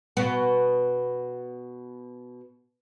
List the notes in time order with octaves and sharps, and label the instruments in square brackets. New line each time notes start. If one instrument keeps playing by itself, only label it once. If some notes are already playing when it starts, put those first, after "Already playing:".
[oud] B2 B3